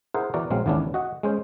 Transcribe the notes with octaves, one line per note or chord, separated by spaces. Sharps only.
E4 G#4 A#4 C5 F#5
E3 B3 F#4 A#4 D5
A#1 F#3 G#3 C4 F5
G#1 D#2 E3 B3 C#4 D4
F#4 D#5 F#5
G#3 C#4 C5